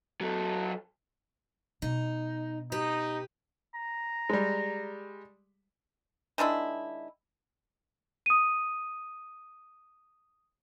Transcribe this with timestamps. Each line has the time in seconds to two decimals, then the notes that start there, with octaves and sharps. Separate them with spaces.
0.21 F#3 A4
1.82 B2 D#4
2.72 D#4 G4 B4
3.74 A#5
4.30 G3 G#3
6.38 D#3 G#3 D4 E4
8.26 D#6 D#7